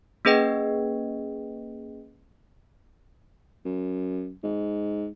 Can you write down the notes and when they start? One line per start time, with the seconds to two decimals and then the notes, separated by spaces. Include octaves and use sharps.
0.25 A#3 C#4 G#4 B4 D#5 G5
3.65 F#2
4.43 G#2